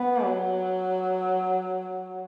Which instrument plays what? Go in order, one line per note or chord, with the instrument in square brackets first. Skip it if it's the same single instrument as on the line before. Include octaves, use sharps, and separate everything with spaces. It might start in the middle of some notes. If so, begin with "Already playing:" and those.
Already playing: [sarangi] B3
F#3